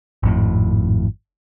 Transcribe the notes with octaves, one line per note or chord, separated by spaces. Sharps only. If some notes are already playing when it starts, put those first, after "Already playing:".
G#1 F2 A2